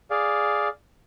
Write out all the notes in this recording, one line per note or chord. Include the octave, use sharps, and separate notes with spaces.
G#4 D5 F5